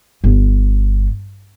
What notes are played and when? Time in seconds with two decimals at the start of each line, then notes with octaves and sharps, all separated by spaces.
0.24 G1